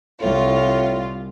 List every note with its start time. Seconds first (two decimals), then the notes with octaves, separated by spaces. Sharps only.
0.21 C2 A2 F4